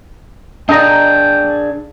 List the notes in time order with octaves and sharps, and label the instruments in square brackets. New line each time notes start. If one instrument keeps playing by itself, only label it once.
[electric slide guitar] D4 G#4 D5 [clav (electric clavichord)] D#5 A#5 [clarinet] G5